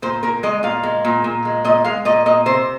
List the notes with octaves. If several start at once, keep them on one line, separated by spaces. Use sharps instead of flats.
A#2 C5
A#2 A#4
G#3 D#5
A#2 F5
G#3
A#2
A#2
G#3
A#2 D#5
G#3 F5
A#2 D#5
A#2 D#5
C3 C5